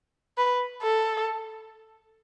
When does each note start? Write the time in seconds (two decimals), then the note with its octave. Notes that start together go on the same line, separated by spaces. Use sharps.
0.38 B4
0.82 A4